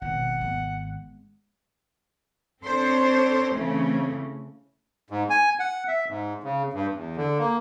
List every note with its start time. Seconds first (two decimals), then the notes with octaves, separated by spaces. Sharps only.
0.02 G#1 G#2 B2 F#5
0.41 G#3 B3
2.63 C4 D4 A4 C5 C#5
3.50 C#3 E3 A3 C4 C#4
5.11 G#2
5.30 G#5
5.60 F#5
5.88 E5
6.09 G#2
6.44 C#3
6.73 G2
6.95 E2
7.17 D3
7.39 A#3